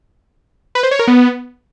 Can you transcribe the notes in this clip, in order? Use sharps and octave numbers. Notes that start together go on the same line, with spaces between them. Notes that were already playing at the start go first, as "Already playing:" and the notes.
B4
C5
C#5
A#4
B3